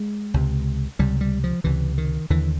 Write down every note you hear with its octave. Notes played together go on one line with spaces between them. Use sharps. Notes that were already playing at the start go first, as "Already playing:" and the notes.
Already playing: G#3
C#2 C3
C#2 C3 G3
G3
F3
C#2 C3 E3
D#3
D#2 D3 E3